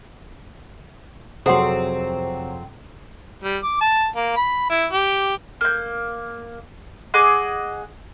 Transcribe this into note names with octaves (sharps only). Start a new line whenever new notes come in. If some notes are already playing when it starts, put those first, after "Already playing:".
F2 C3 F#3 C4 G#4 A4 F#5 C6
G3
D6
A5
A#3
B5
E4
G4
A#3 G6
G#4 D#5 F#5 D6